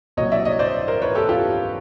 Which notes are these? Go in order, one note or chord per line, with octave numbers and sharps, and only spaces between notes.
C2 A#2 F#3 C#5 D#5
D5 E5
C#5 D#5
C5 D5
A#4 C5
B4 C#5
G4 A4
F4 G4